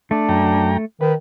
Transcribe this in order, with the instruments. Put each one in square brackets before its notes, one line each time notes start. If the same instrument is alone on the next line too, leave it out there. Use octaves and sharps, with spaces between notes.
[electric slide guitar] A3 [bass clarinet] D4
[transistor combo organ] F#2 G5 A#5
[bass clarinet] D#3 [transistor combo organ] B4